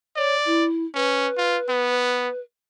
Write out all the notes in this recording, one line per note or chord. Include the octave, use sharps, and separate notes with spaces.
C#5 D5
E4
C#4 B4
F4
B3